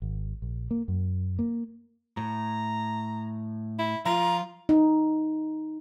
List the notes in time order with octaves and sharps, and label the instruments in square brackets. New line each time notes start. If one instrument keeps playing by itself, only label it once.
[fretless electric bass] G#1
A#1
A#3
F#2
A#3
[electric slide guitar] A2 [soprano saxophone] A#5
[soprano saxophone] E4
[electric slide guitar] F3 [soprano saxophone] F4 [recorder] A#5
[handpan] D#4